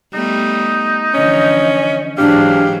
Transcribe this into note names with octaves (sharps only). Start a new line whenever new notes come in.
G3 A3 B3 D#4
D3 E3 F3 C#4 D#5
G#2 E3 F#3 D4 G4 F5